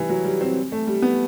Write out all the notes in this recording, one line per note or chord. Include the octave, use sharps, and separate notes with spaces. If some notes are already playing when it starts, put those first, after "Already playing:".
Already playing: E3 G3
F#3
G3
C4
A3
G3
B3